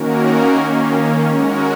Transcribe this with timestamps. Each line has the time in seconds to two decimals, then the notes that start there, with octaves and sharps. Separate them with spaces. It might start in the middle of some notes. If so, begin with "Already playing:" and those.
Already playing: D#3 A#3 C#4 F#4 A#4
0.56 D#3 A#3 C#4
1.24 G#3 C#4 F#4 A#4